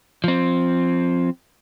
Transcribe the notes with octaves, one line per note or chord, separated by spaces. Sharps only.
F3 C4